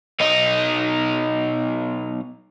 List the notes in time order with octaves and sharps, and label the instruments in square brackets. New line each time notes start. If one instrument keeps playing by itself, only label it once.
[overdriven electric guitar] B1 D#4